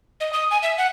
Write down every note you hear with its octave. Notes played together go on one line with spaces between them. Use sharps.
D#5
D#6
G#5
E5
F#5